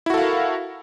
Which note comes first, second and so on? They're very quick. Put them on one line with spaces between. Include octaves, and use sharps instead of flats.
E4 F#4 A4 F5 A#4